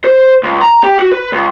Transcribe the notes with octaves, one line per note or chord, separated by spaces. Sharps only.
C5
C#2
A#5
G4
F#4
B4
C#2